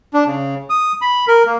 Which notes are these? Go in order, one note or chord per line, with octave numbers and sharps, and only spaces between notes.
D4
C#3
D#6
B5
A#4
A#3